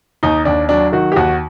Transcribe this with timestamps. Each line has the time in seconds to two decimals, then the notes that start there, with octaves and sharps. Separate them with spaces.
0.23 D#2 D#4
0.45 D#2 D4
0.69 F#3 D4
0.92 D#3 F#4
1.12 G4
1.16 D#2 F#4